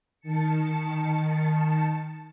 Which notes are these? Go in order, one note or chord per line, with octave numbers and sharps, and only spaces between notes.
D#3 A5 C#7